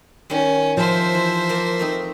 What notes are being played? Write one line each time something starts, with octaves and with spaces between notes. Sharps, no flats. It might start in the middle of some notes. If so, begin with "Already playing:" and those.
D#3 G3 C#4
F3 C5 E5
E3
A#3 F4 A#4
A3 C4 D#4